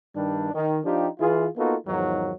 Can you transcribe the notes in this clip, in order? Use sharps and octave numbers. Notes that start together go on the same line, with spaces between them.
G2 D#3 G3 D4
D#3
F3 D4 D#4 F4 G4
E3 F4 G#4
A#3 B3 D#4 F4 F#4 A4
E2 G#2 D#3 F3 F#3